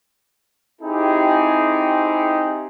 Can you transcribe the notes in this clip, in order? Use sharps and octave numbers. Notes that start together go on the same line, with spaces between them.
C4 D#4 E4 G4 G#4